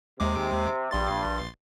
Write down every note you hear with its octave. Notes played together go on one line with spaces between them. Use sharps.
D#2 C3 G#3 D6
A#1 G2 C6 A6